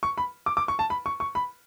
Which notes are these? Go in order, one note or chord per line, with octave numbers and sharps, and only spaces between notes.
C#6
B5
D6
D6
C#6
A5
B5
C#6
C#6
B5